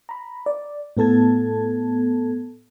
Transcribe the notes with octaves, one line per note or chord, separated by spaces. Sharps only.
A#5 B5
D5
A2 B3 A4 A5 G#6